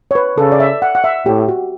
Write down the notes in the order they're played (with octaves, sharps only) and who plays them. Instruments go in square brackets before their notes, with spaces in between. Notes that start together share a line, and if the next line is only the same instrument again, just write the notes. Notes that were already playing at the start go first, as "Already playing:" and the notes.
[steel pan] C#5
B4
[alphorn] C#3 [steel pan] A4
[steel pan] D5
E5
F#5
F#5
E5
[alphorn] A2 [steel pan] G4
[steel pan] F#4